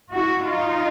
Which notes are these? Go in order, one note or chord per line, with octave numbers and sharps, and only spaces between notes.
E4 F#4
D#4 F4